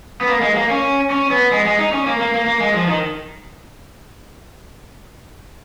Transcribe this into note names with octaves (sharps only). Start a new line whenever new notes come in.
B3
A#3
G#3
A#3
C#4
C#4
B3
G#3
G#3
D#4
C#4
A#3
A#3
A#3
A#3
G#3
F3
D#3